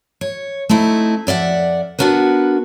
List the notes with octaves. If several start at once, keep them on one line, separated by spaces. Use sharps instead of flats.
C#5
A3 C4 D#4 E4
F2 D5 E5 F#5
B3 D4 F#4 A#4 B4